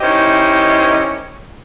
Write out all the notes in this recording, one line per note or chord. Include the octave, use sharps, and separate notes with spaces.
D#3 C#4 E4 G4 C5 D#5